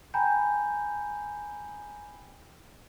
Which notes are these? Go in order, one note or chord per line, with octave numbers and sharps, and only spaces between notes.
G5 G#5 A#5 B5 G6